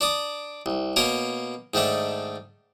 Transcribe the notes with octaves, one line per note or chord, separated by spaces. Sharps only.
D4 D5 D#6
C2
B2 A#3 C#4 A#4
G#2 D#3 A3 D4